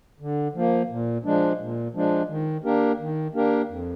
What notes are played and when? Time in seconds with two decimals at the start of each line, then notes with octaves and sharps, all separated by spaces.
0.20 D3
0.55 F3 A#3
0.90 A#2
1.25 F3 G#3 D4
1.60 A#2
1.95 F3 G#3 D4
2.30 D#3
2.64 A#3 D4 G4 A#4
3.00 D#3
3.34 A#3 D4 G4 A#4
3.68 F2